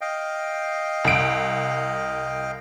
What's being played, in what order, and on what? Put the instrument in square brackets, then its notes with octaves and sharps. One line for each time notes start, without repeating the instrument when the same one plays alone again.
[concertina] D#5 F5 G5
[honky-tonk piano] C2 D7